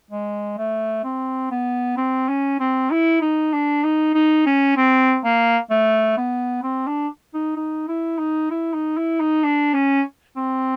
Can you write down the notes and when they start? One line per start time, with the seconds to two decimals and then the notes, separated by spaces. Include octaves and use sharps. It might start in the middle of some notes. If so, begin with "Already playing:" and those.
0.11 G#3
0.58 A3
1.04 C4
1.51 B3
1.97 C4
2.29 C#4
2.60 C4
2.91 E4
3.21 D#4
3.53 D4
3.84 D#4
4.14 D#4
4.46 C#4
4.77 C4
5.24 A#3
5.70 A3
6.17 B3
6.63 C4
6.87 D4
7.34 D#4
7.57 D#4
7.88 E4
8.18 D#4
8.51 E4
8.74 D#4
8.97 E4
9.20 D#4
9.44 D4
9.74 C#4
10.36 C4